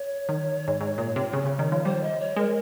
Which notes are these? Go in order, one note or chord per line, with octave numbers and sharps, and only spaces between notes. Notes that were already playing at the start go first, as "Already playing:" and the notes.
Already playing: C#5
D#3
G#2
G#2
A#2
C3
C#3
C#3
D#3
F3
G3 C5
D#5
C#5
G#3 A#4